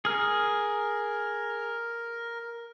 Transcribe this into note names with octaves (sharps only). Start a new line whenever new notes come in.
G#4 A#4 F6